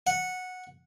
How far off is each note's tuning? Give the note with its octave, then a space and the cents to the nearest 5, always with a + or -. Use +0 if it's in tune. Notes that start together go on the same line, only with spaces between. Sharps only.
F#5 -10